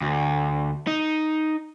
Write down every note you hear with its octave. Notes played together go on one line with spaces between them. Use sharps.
D2
D#4